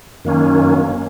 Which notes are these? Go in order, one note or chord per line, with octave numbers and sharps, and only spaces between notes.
F#2 D#3 A#3 C#4